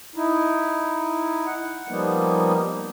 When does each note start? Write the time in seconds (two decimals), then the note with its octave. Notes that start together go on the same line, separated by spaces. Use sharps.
0.15 D#4 E4
1.47 F#5
1.89 F3 G3 A#3 B3 D#4